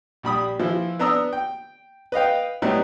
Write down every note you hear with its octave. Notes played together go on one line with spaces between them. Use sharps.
A#1 G3 B5 D#6
E3 F3 E4
B3 D4 A#5 D#6 E6
G5
B4 D#5 F5 G5
A2 F#3 G3 B3 D#4 E4